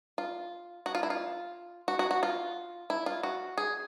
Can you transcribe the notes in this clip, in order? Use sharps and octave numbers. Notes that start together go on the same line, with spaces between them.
F4
F#4
F4
E4
F4
F#4
F#4
F#4
F4
E4
F4
F#4
G#4